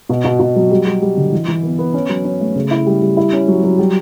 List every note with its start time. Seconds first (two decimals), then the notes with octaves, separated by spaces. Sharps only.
0.09 B2
0.25 B2
0.40 B2
0.56 F#3
0.71 G3
0.86 G3
1.02 G3
1.17 D3
1.32 E3
1.48 E3
1.63 B3
1.79 B3
1.94 C#4
2.09 F#3
2.25 C#4
2.40 A3
2.56 C#3
2.71 E4
2.86 G3
3.02 G3
3.17 E4
3.33 C#4
3.48 F#3
3.63 F#3
3.79 G3